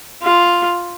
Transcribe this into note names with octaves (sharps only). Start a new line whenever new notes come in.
F4